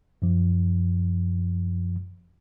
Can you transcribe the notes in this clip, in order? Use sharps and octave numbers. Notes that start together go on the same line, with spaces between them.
F#2 F3